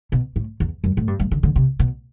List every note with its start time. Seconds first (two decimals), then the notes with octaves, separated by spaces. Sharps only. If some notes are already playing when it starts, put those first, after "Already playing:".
0.12 B2
0.36 A2
0.60 E2
0.84 F#2
0.97 A2
1.08 G2
1.19 G2
1.31 D3
1.43 D3
1.56 C3
1.79 B2